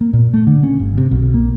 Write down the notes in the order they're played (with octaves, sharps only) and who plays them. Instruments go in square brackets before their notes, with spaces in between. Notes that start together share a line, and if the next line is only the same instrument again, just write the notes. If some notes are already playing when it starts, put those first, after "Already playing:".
[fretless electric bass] A#3
A#2
A3
D3
C#4
G1
C3
B1
A#3